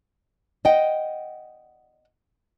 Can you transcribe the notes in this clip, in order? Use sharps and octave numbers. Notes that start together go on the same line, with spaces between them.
D#5 F#5 G5